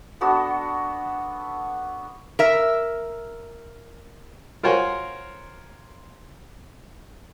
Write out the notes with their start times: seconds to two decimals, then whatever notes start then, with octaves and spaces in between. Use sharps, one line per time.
0.21 B3 D4 F#4 A4
2.39 A#4 E5
4.63 F4 A#4 C5 C#5 F#5 G#5